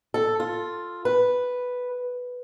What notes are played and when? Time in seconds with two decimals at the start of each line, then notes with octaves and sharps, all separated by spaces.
0.14 A4
0.40 F4
1.05 B4